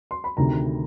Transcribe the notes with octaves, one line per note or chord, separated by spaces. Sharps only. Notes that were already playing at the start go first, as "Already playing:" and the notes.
C6
B5
D2 C3 D#3 A#5